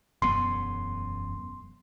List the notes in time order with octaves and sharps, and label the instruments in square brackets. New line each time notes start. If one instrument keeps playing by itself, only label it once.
[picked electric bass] E1 F#2 B3 [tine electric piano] C6